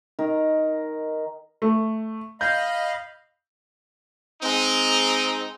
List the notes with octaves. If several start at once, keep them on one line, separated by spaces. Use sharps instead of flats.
D#3 D#4 A#4
A3
D#5 F5 B5 G6
G#3 C4 D#4